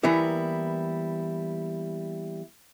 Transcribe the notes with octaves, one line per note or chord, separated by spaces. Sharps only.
E3 G3 A#3 B3 E4 A#4